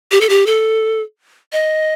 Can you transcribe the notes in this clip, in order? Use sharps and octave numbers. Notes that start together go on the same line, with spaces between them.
G4
A4
G4
A4
D#5